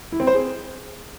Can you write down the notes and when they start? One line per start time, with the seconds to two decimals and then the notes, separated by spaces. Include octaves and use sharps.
0.12 E4
0.20 C4
0.27 C5
0.35 G#4